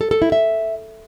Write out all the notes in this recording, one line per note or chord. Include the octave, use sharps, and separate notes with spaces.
A4
A4
E4
E5